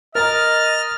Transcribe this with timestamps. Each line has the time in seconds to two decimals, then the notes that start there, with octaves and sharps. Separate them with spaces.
0.15 A#4 D#5 A#5 F6 A6